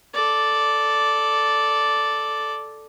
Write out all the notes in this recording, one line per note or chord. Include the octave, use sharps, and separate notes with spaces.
A4 D5